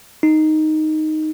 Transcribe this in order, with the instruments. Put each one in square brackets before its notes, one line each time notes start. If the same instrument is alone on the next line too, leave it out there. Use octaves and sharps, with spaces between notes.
[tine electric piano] D#4